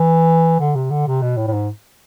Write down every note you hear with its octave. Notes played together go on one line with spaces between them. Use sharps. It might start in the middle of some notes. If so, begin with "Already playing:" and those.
Already playing: E3
D3
C3
D3
C3
B2
A2
A2
G#2